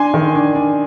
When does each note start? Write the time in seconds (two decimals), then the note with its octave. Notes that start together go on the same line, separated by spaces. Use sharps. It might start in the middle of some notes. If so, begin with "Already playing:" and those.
Already playing: D4 G#5 C6
0.14 D#3
0.35 D4
0.55 D4